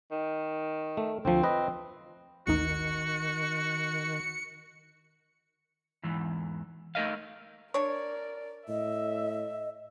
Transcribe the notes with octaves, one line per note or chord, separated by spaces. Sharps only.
D#3
A3
D2 F3 C4
B4 D#5
A1 D#2 D#3 D#4 F#4 C#7
E2 G#2 E3
A3 D#4 A#4 D#5 F5
D4 A#4 C#5 D5
A2 D#5 E5